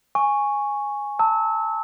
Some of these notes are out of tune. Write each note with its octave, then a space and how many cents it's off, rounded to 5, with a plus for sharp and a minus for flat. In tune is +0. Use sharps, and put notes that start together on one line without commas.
G#5 -5 C#6 +0
A5 +20 E6 -25